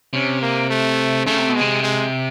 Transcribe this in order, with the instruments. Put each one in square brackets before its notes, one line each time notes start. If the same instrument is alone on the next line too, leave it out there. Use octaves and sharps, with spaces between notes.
[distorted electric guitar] C3 [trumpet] C#4
[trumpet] A#3
A3
[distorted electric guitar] C#3 [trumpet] A3
[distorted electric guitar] C3
B2
[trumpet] G#3
[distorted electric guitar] C3
[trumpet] G#3